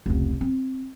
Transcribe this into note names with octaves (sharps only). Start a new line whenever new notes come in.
F1 C#2
C4